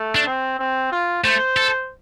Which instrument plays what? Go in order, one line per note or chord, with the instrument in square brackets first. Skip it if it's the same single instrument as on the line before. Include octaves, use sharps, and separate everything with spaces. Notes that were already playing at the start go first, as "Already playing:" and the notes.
Already playing: [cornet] A3
[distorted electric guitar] D4
[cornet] C4
C4
F4
[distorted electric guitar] A3 [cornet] C5
[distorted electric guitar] A4